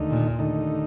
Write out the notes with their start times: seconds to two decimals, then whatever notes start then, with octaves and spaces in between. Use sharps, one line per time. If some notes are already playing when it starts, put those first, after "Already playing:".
Already playing: D#2 D3 A3 D#4
0.10 A#2
0.39 D#2 D3 A3 D#4